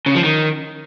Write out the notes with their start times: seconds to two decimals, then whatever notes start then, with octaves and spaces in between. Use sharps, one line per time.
0.06 C#3
0.15 F3
0.24 D#3